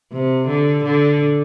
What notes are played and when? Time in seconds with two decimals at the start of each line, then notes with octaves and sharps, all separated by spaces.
0.12 C3
0.48 D3
0.84 D3